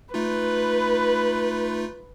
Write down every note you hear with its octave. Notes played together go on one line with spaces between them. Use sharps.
A3 D#4 F4 B4